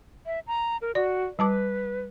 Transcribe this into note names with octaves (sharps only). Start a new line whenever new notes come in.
E5
A#5
A#4
F#4 D5
G3 B4 A5 D6